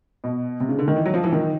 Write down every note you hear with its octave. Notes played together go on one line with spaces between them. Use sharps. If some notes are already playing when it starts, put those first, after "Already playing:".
B2
C3
C#3
D3
D#3
E3
F#3
F3
E3
D#3